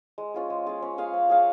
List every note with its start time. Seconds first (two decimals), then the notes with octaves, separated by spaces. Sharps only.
0.18 G#3
0.34 C#4 F4 G#4
0.50 G#3
0.66 C#4 F4 G#4
0.82 C#4
0.98 G#4 C#5 F5
1.14 C#4
1.30 G#4 C#5 F5